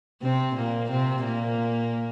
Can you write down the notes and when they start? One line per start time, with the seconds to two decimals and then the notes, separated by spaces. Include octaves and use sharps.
0.22 C3 C4
0.56 A#2 A#3
0.90 C3 C4
1.24 A#2 A#3